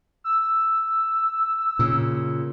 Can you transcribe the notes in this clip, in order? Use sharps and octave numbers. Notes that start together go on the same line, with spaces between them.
E6
A#2 C#3